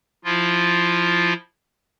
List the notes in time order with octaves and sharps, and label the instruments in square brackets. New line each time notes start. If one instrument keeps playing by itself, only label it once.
[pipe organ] F3 E4 F4